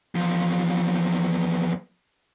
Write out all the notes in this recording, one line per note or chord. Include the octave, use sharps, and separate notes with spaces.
E2 F3